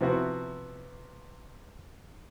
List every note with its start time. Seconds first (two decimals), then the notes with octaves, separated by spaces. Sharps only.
0.01 C3 F3 B3 E4 F#4